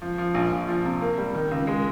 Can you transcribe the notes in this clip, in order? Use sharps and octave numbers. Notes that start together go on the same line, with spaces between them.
F3
F3
A#1
A#1
F3
C3
A#3
G3
D#3
C#2
G#3